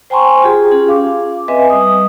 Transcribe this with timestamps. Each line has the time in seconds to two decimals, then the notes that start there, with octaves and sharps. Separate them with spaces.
0.10 C5 G5 G#5 A#5 C6 C#6
0.43 F4 G4 G#4
0.71 C#4 F4 G#4
0.88 F5 D6
1.48 C4 B4 D#5 E5 G#5
1.70 G3 D#6